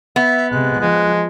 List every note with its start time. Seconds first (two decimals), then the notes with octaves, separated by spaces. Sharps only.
0.16 B3 E5
0.52 C3 G#3 F#6
0.80 F3 G#3